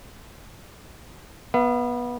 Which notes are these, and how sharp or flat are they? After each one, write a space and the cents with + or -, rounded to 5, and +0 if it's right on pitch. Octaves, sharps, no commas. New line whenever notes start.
B3 -20 E5 +40